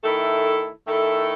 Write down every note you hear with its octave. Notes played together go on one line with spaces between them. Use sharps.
D#3 A3 E4 A4
D#3 A3 E4 A4